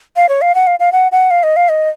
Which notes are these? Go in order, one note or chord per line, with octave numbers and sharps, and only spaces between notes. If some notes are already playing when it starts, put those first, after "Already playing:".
F5
C#5
F5
F#5
F5
F5
F#5
F#5
F5
D#5
F5
D#5